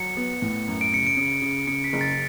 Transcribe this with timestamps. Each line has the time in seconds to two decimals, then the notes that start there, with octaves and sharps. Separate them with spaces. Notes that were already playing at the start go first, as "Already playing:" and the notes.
Already playing: F#3 C#7
0.17 B3
0.42 A2
0.68 F#2
0.81 D7
0.92 C#3 C#7
1.07 D7
1.17 C#3
1.42 C#3
1.67 C#3 C#7
1.84 B6
1.93 F#1
2.01 A6